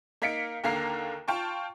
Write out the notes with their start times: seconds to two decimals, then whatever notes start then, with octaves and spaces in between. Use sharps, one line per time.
0.22 A#3 D#4 F5 B6 C#7 D7
0.64 D#2 D3 A#3 F5 A#5 C7
1.28 F4 G5 A5 C#6